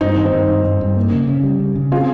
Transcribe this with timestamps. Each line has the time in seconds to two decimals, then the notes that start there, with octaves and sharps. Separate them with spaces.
0.01 G2 C4 D#4
0.17 D#3
0.25 C4 D#4
0.33 G2
0.48 G2
0.64 G2
0.81 G2
0.96 A#3
1.12 C#3
1.27 C#3
1.43 G3
1.60 C#3
1.75 C#3
1.92 C4 F4 G#4